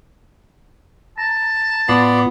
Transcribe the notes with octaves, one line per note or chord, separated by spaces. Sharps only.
A5 A#5
A2 B3 F4 D5 C6